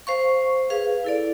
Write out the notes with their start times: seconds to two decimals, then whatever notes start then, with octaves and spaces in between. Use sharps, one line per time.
0.07 C5 F5 C#6
0.70 G#4 B4 F5
1.04 E4 A4 D5